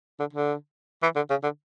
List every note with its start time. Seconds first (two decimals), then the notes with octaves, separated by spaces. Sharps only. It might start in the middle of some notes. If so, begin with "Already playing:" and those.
0.20 D3
0.33 D3
1.03 E3
1.16 D3
1.30 C#3
1.43 D3